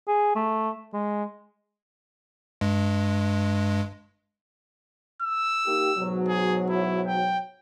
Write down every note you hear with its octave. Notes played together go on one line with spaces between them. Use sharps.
G#4
A3
G#3
G2 G#3
E6
A#3 D#4 G4
G#2 B2 F#3
G#4
E4
G5